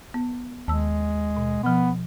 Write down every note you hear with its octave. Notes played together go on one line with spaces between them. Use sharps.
B3
D#2 G#3 A5 E6
B2
B2 F3 B3